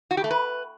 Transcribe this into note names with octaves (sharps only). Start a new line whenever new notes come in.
F#4
G4
A3
B4